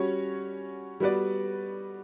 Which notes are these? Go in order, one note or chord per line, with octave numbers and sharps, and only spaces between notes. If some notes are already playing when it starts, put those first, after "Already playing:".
Already playing: G3 C#4 F#4 C#5
G3 B3 F#4 B4 D5